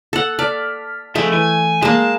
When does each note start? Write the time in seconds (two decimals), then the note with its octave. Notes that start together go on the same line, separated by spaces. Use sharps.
0.13 A4 F#5
0.39 D5 A5 F6 B6
1.15 F3 A3 G#4 D#5 E5
1.34 E3 G#5
1.82 G#3 A#3 A5